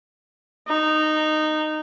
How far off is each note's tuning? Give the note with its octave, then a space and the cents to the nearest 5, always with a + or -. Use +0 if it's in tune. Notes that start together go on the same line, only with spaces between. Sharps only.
D#4 -15